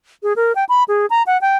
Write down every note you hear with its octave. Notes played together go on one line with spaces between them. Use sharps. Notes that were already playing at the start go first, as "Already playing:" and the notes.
G#4
A#4
G5
B5
G#4
A#5
F#5
G5